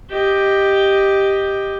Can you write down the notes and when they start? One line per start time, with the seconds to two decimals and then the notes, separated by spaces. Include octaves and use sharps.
0.10 G4 D#5